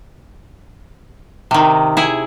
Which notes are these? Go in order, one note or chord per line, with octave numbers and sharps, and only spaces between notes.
C3 D#3
E4 G#4